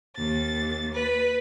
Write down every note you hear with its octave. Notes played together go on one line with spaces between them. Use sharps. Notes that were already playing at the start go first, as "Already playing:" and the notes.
D#2 A6
B4